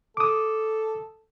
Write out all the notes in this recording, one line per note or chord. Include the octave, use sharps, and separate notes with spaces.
A4 D6 D#6